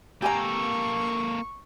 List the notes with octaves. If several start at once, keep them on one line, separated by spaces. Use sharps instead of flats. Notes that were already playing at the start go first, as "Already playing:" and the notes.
A#3 G4 A4 G#5 A#5 C#6